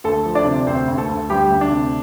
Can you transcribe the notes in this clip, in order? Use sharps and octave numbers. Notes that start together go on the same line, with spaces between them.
D2 A3 A4
F3
D4 D5
C3
D2 C4 C5
D2
A3 A4
D2
D2 G3 G4
D2
D4
C3